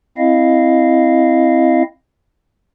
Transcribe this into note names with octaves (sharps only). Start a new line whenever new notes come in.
C4 E4 D#5 F5